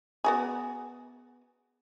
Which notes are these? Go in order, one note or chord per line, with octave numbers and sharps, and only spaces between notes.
B3 F#4 G#4